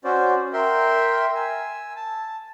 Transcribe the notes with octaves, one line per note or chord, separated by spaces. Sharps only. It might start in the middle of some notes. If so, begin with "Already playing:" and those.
C#4 F#4 C5 D5
A#4 E5 G5 C6
G#5 E6
A5